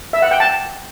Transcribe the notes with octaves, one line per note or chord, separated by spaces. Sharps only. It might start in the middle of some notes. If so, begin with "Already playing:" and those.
E5
F#5
G5
A5